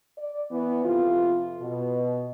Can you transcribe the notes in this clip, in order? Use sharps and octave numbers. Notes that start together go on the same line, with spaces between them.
D5
E3 B3
F2 C3 F4
B2